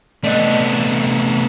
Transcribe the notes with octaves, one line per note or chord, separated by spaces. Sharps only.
C3 A3 B3 D4 D5 D#5 F#6